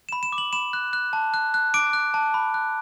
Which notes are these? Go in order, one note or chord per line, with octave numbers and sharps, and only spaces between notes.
B5 E7
E7
D6
F#7
B5 E7
F#6
F#6
A5
F#6
F#6
D6 D7
F#6
A5
B5
F#6